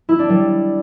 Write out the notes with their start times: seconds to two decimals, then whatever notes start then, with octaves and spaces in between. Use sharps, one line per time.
0.09 E4
0.19 D4
0.29 G3